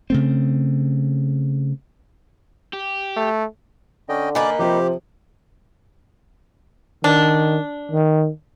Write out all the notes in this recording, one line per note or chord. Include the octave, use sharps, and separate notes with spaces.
C#3 A3 C4
G4
A3
D3 C#4 D#5 G5
A#3 D#4 B4 D5 G#5
C3 F3 G4 C5
D#3 D4
D#3